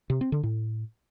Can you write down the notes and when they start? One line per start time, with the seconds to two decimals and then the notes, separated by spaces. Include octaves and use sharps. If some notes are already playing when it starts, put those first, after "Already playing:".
0.10 C3
0.21 C4
0.32 D3
0.43 A2